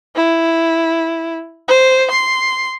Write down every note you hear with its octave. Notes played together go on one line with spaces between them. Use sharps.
E4
C5
C6